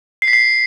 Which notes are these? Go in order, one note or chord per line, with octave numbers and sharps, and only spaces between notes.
C7
B6
C7